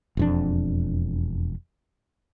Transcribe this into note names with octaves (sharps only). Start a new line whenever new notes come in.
E1 F2 D4